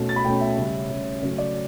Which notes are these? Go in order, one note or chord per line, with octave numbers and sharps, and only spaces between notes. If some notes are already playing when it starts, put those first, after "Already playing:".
Already playing: B2 A3 C#4
A6
B5
B2 A3 C#4 G5
E5
C#3 G3 C#4
C#3 G3 C#4
C#3 F#3 A3 C#5
D5